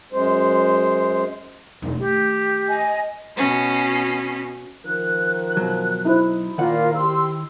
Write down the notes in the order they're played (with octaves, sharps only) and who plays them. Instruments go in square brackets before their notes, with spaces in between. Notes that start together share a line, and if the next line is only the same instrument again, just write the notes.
[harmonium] F#2 G#3 C5
[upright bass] E1 D#2
[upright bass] D#3 A3 [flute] G4
[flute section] D#5 G#5
[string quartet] B2 C#4
[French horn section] D#3 F3 A#4 [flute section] F#6
[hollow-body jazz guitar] B2 F#3
[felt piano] D#4 E4 C5
[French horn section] A#2 [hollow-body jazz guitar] D#3 F#5 [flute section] F4 A#4
[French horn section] G4 [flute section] C6 E6